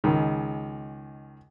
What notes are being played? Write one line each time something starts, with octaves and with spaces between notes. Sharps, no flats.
C#2 D#3 G#3